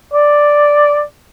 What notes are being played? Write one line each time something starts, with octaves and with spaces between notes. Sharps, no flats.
D5